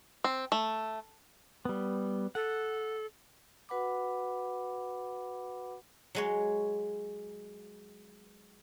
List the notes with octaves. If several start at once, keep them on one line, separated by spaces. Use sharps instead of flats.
C4
A3
G3 B3
A4 F#5
F#4 B4 F#5 B5 D6
F#3 G#3 C#5